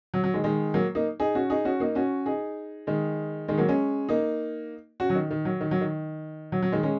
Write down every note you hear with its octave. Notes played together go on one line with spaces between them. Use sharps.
F#3
F#3
D#3 G#3
D#3 G#3
F#3 A#3
A#3 D#4
D#4 G#4
C#4 F#4
D#4 G#4
C#4 F#4
A#3 D#4
C#4 F#4
D#4 G#4
D#3 G#3
D#3 G#3
F#3 A#3
G#3 C#4
A#3 D#4
C#4 F#4
F#3
D#3
D#3
F#3
D#3
F#3
D#3
F#3
F#3
D#3 G#3
G#3 C#4